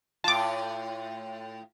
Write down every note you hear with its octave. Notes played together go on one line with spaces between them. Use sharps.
A2 F4 A5 D6